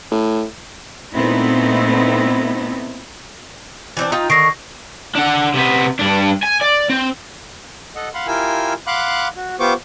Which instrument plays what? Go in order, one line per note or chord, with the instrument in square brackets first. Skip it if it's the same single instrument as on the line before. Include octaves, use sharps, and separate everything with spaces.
[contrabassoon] A2
[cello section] A#2 A3 B3 C4 D#4 E4
[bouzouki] E3 C4 D4
D#4 F4 G5
[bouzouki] D3 D#3 [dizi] C#6 [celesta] A#6 C7 D7
[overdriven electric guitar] D4 F#5
C3 B3
G2 D4
G#5
D5
C4
[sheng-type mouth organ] A4 D#5 F#5
F5 F#5 B5 C6
E4 F4 G4 A#4 G#5 E6
F5 F#5 B5 C6 D6 F#6
F#4
B3 F4 G4 C5 C#6 D6